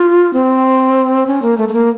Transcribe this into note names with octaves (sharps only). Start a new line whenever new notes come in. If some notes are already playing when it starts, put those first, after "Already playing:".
Already playing: F4
C4
C#4
A#3
A3
A3
A#3